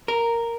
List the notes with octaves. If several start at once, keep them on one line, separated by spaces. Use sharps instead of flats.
A#4